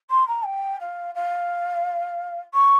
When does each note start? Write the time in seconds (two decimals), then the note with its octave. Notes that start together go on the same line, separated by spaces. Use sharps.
0.10 C6
0.27 A#5
0.45 G5
0.80 F5
1.14 F5
2.54 C#6